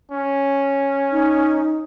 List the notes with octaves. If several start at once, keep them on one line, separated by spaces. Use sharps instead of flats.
C#4
D#4